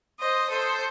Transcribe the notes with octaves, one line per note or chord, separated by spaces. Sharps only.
C5 D#5
A4 C5